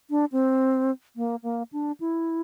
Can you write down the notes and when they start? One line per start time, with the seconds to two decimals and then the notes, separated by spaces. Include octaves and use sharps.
0.10 D4
0.32 C4
1.16 A#3
1.43 A#3
1.72 D4
2.00 E4